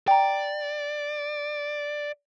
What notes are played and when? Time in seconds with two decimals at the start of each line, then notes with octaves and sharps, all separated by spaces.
0.08 D5 G5 A#5